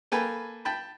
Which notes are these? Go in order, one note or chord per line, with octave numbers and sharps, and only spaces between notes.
A#3 A4 B4 G5 G#5
G5 A5 B5